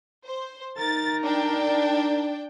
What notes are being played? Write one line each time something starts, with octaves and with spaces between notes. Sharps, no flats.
C5
D#4 A#4 A6
D4 G5